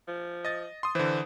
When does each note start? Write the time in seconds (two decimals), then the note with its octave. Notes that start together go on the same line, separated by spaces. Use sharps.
0.08 F3
0.45 D#5 A6
0.83 C6 D#6
0.95 D3 E3 C5